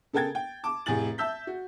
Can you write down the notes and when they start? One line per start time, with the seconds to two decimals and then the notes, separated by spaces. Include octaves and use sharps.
0.13 C#3 A4 A#4 G5 G#6 A6
0.35 G5
0.64 A5 D6
0.86 F1 A2 G#4 G#5 A6 F#7
1.18 E5 A5 E6 G6 B6
1.47 F#4